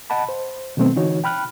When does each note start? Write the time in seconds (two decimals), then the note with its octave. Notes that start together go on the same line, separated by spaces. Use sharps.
0.10 D#5 F#5 A5 B5
0.29 C5
0.77 B2 D#3 F#3 A3 B3 C4
0.96 D3 E3 D#4 F#4 C#5
1.24 G5 B5 F6 F#6